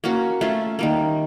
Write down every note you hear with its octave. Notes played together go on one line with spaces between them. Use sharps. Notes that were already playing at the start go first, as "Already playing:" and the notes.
A#3 C#4 F#4
A3 C#4 F4
D#3 G3 A#3